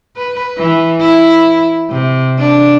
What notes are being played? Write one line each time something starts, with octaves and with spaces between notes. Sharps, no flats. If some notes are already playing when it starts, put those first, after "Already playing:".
B4
E3
E4
C3
D4